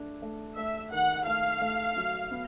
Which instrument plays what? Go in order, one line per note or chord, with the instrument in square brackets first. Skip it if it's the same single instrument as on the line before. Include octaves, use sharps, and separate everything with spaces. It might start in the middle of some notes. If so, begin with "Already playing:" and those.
Already playing: [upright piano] A3 D4
A3
[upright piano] A3 [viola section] E5
[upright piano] D#3 [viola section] F#5
[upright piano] A3 [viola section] F5
[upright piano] A3
F#3
B3